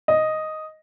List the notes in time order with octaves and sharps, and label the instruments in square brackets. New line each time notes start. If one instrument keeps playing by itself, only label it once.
[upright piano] D#5